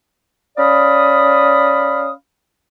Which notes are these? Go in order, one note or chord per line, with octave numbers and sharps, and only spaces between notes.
C#4 D5 F5 B5 D#6